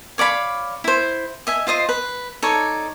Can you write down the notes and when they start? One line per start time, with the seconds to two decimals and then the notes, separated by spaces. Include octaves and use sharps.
0.18 C#5 D5 F5 B5
0.84 E4 C5
1.47 D#5 E5 G#5
1.67 F4 C5 D#5 C6
1.89 B4
2.42 D#4 A4 C#5 D5